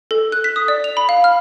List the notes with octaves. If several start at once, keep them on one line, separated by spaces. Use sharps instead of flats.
A4
F#6
B6
D#6
D5
F7
B5
F5
F6